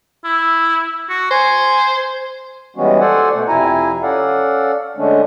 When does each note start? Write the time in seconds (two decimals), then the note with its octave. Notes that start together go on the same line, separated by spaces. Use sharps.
0.24 E4
1.09 F#4
1.31 C5 G#5
2.77 E3 G3 G#3 B3 C#4 F#4
3.00 A4 C5 D5 F#5 G#5
3.33 B2 A3
3.48 F2 C3 E4 G#5 A#5
4.02 C#4 A4 D5 F5 F#5
4.97 D3 G#3 A3 C#4 D4